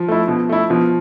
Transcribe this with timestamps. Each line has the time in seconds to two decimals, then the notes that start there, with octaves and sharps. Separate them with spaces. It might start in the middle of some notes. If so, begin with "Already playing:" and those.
Already playing: F3
0.08 A3 E4
0.28 B2
0.49 A3 E4
0.70 B2 F3